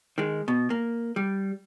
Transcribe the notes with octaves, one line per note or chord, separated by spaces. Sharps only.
D#3 G#3
B2
A#3
G3